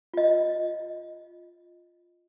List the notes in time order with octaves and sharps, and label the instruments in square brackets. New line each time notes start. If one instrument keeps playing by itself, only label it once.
[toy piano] F4 D#5